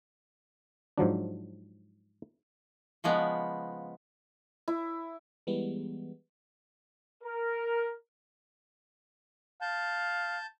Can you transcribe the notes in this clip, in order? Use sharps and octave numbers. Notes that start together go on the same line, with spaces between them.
G#2 F3 F#3 D4
C#3 F3 G#3 B3
E4
E3 G3 G#3 B3
A#4
F5 A5 G6